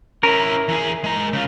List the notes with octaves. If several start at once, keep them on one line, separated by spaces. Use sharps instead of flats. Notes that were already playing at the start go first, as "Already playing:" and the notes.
C#4 E4 A#4
E3 G#4
G#3 A#5
C#3 F4